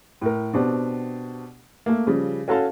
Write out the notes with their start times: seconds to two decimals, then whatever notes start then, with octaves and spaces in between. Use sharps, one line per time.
0.21 A2 A#4
0.53 B2 B3 C4 D4 G4
1.86 A3 A#3
2.07 C#3 F3 G3
2.48 C#4 F#4 A4 F5 A5